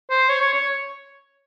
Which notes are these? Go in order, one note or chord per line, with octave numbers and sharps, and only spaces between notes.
C5
C#5
C#5
C#5